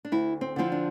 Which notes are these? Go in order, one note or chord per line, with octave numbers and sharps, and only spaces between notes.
D4
D2 E4
C4
D3 F3 C4 E4
D4